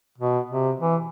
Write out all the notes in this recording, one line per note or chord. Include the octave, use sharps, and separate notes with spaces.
B2
C3
E3